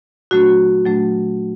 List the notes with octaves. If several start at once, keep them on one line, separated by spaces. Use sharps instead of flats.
A#2 F#3 A3 D4 F#4
A#2 F#3 A3 D4